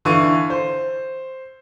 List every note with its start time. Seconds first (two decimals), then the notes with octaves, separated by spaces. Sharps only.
0.05 D3 E3 F5 C#6 D#7
0.50 C5